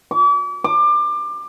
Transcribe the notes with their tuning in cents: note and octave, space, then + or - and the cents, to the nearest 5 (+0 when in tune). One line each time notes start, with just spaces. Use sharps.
D6 -40
D6 +25